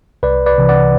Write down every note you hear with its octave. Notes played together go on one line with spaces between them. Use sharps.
C2 B4 D5
B4 D5
C3 E3
D5 F#5